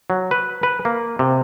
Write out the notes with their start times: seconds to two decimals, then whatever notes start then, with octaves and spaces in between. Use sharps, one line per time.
0.10 F#3
0.31 B4
0.63 B4
0.85 A#3
1.19 C3